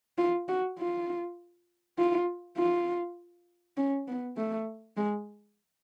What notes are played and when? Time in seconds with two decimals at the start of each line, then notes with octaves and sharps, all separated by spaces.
0.18 F4
0.48 F#4
0.78 F4
1.98 F4
2.57 F4
3.77 C#4
4.08 B3
4.37 A3
4.97 G#3